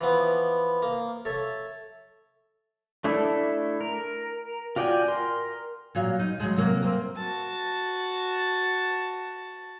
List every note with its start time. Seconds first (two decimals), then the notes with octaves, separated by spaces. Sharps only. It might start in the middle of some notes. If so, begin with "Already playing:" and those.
0.01 E3 F3 B3
0.82 A#3
1.25 A4 C#5 E5
3.04 A3 D4 E4 A4
3.81 A#4
4.76 F4 F#4 D5 G5 G#5
5.08 A#4 C6
5.95 A#2 F#3 F5
6.20 D#4
6.40 F#3 G#3
6.56 C3 F#3 A#3
6.82 A#3 C4
7.16 F#4 A5